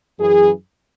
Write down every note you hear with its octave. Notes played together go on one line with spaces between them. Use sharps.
F#2 E3 G#4